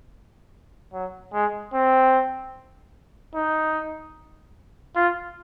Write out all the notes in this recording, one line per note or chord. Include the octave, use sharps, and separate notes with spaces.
F#3
G#3
C4
D#4
F4